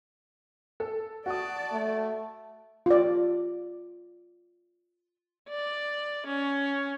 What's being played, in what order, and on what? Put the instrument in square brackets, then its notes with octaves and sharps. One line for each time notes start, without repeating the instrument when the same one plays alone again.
[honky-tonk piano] A4
[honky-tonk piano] F#4 D#6 [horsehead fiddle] D5 A5
[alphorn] A3
[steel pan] F4 D5
[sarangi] D5
C#4